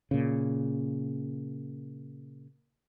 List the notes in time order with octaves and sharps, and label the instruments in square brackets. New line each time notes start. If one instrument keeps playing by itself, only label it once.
[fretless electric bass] A#2 C#3